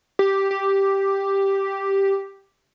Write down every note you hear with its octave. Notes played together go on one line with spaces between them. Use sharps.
G4
G4